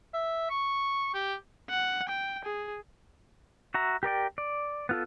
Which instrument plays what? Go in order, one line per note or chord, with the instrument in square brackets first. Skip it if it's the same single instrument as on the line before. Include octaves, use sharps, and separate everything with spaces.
[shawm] E5
C#6
G4
[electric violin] F#5
G5
G#4
[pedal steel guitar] F#4 E5 A#5
G4 A#4 D5 G5
D5
B3 F4 A4